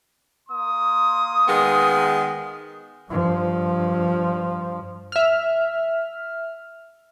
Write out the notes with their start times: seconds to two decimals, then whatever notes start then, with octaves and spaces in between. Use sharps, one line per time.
0.49 A#3 C6 D#6
1.48 D#3 G#3 B3
3.09 G2 F3
5.12 E5 F6